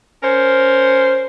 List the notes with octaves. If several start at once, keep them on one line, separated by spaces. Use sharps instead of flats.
C#4 A#4 C5